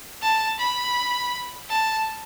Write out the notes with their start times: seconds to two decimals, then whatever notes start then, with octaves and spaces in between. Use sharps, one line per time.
0.22 A5
0.59 B5
1.69 A5